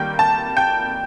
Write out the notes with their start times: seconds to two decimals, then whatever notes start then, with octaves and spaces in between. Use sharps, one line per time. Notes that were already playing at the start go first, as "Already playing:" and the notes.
Already playing: D#3 G3 A#3 G5
0.19 A5
0.57 G5